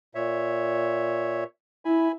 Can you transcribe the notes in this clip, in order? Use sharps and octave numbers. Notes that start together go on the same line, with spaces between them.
A#2 C#5 E5
E4 G#5 B5